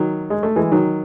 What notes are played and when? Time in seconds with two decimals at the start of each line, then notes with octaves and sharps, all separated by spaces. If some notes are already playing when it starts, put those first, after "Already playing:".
Already playing: D#3 F#3
0.30 G#3
0.43 A3
0.56 E3 G#3
0.72 D#3 F#3